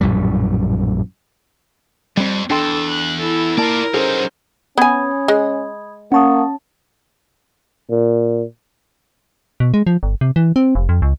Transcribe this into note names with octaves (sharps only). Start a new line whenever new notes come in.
A#1 F#2 A2 G3
F2 G3 C4
E2 D4 A4 G5 C6
F#6
E4 A4
A#3 F4 A#4 D5 A5
F#3 C#4 D#4 G#4 A4 C5
B3 C#4 G#5 B5 D#6 G#6
G#3
A#3 C#4 F#5 A5 C#6 D#6
A#2
B2
G#3
F3
G1
C3
E3
C4
F1
F2
C#2